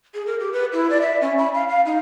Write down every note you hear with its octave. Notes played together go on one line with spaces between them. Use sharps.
G#4
A#4
G4
B4
E4
D5
E5
C#4
B5
F5
F5
D#4